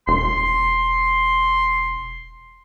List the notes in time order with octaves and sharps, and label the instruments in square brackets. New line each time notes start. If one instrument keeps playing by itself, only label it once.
[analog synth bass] E1 [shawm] C6